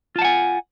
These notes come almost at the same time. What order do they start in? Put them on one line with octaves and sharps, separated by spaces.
F4 A5 F#5 G#5